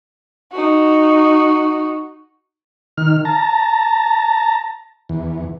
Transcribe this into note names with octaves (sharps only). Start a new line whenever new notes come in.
D#4 F#4
D#3 F6
A5 A#5
E2